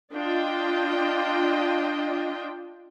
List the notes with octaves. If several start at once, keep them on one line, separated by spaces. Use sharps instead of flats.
D4 F4 D#5 G5